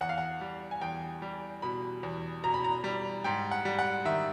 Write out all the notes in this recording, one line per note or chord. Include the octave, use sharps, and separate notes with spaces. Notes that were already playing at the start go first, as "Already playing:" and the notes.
E2 F#5
F5
F#5
G3
G#5
E2 G5
G3
B2 B5
E2
B2 A#5
B5
A#5
G3
G#2 G5
F#5
G3
F#5
D#3 E5